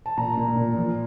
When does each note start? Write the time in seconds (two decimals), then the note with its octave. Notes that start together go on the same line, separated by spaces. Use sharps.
0.06 A5
0.17 A#2 A#5
0.37 A#2
0.57 A#2
0.76 F3